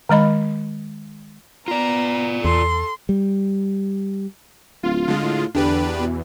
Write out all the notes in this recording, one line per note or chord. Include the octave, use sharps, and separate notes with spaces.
D#3 G#3 D#5 B5
B3 F4 D5 A#5
E2 A4 C6
G3
D1 F4
D3 G#3
A2
E2 D3 D4 G4 B4
B2